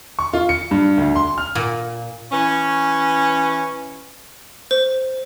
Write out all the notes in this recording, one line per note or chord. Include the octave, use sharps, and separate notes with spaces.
C#6
F4
C#7
G2
D2
C6
F6
A#2
E3 C#4
C5